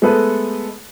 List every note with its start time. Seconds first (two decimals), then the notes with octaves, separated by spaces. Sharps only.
0.02 G#3 A3 B3 A4 B4